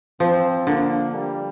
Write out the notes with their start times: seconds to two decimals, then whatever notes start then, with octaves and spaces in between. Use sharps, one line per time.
0.20 F3 C4
0.67 D3 A#3
1.14 G3